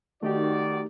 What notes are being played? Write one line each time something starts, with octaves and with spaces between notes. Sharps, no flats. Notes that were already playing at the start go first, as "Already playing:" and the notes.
D#3 A3 D#4 F#4 G4 D5